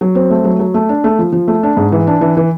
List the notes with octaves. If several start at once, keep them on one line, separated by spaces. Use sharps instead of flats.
F#3
C4
A3
F#3
F#3
A3
D4
A3
F3
F3
A3
D4
G#2
E3
D4
E3
E3